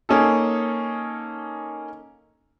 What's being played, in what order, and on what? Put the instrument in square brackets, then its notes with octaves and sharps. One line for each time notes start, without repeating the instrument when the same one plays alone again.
[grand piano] A#3 C#4 D#4 A4